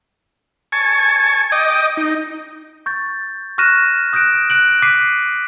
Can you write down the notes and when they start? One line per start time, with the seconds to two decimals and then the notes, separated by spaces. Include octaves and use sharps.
0.72 G#5 A5 C#6
1.52 D#5 G5 D6 D#6
1.97 D#4
2.86 C#6 G6 A6
3.58 C#6 F6 F#6 A#6 D#7 E7
4.13 D#6 F#6 G6 A#6 D7 E7
4.50 F#6 D7 F#7
4.82 D6 F#6 B6 C7 D#7